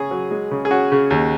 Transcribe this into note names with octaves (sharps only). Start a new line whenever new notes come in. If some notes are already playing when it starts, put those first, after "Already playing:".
Already playing: C#3 C#4 G#4
F#3
G#3
C#3
G#4
C#4 F#4
C#3
D#2